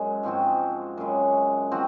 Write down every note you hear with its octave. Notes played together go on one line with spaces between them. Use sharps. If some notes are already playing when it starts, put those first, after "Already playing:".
Already playing: F#2 G#3
G#2 F3 C4 F#4
F#2 C#3 G#3
F3 C4 F#4